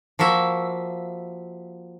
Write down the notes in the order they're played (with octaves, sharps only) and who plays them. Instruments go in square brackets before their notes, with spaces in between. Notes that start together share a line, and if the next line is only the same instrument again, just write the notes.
[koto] F3 A#3 F#4 E5